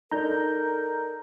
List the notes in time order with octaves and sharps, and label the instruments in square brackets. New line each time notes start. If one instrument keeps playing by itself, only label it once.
[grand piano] D#4 A4 D5 [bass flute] A#4 [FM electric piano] A#5 G6